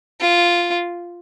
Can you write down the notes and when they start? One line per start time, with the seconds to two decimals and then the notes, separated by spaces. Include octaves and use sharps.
0.20 F4